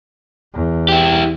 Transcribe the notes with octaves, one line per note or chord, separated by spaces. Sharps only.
E2
E4 G4